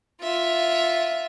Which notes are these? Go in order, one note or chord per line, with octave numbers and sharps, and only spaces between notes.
F4 E5